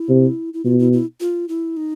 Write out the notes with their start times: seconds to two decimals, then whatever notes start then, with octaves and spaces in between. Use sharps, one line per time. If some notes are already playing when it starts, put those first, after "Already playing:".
Already playing: E4
0.09 C3
0.54 E4
0.65 B2 F4
0.79 E4
0.93 E4
1.21 F4
1.49 E4
1.77 D#4